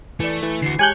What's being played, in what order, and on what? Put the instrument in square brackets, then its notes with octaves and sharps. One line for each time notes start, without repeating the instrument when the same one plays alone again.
[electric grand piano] E3 D5 [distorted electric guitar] A3
[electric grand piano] E3
[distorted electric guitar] D3 F#4 [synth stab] C7
[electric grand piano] G#3 G4 A5 [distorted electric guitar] C#5 [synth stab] G#5 F#6 G6